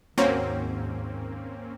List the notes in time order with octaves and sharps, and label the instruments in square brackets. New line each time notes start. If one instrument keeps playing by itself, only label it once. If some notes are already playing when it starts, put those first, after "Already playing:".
[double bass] D#2 G#2 [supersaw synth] A#3 C4 C#4 [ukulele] F#4 C5 C#5